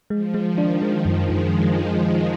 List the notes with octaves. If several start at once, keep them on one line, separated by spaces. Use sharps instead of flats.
F3 G#3
G#3
D#3
D4
F3 G#3
F#2
G#3
F#2